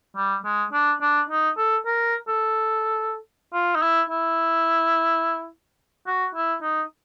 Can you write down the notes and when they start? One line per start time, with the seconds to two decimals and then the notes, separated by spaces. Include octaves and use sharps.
0.16 G3
0.44 G#3
0.73 D4
1.01 D4
1.30 D#4
1.57 A4
1.86 A#4
2.28 A4
3.53 F4
3.75 D#4
3.82 E4
4.10 E4
6.07 F#4
6.35 E4
6.62 D#4